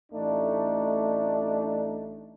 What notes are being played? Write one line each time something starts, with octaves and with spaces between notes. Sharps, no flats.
A1 A3 D4 D#4